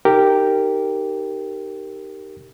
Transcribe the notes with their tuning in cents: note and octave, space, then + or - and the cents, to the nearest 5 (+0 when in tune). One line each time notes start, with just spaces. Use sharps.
D#4 +0 G4 +0 A#4 -15